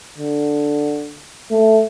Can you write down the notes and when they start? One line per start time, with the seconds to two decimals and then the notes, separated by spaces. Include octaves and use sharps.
0.18 D3
1.51 A3